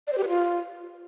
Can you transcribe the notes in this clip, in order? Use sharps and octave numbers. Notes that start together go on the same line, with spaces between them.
D5
C5
G4
B4
F4